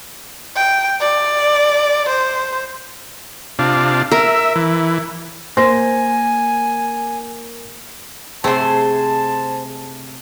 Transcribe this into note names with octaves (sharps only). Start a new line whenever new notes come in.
G5
D5
C5
C3 D4 F4
A#4 E5
E3
A#3 C5 G#5 A#6
C3 A3 G#4 C5 A5